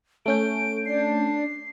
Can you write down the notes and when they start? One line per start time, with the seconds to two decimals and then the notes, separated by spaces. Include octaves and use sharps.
0.26 A3 C#4 G6 D7
0.86 D4 C7